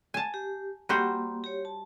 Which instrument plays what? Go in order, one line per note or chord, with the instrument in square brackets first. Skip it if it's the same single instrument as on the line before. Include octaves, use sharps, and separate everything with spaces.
[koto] G#5 A5
[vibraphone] G4
[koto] G3 F#4 C5 [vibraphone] A#3 G4
[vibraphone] G4 C#5
A5